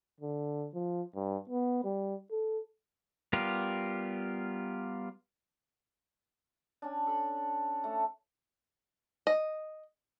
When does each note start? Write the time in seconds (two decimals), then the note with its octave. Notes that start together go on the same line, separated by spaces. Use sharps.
0.20 D3
0.74 F3
1.15 G2
1.49 B3
1.84 G3
2.31 A4
3.33 G3 B3 F4 G4 A#4
6.82 C#4 D4
7.07 A4 B5
7.84 A3
9.27 D#5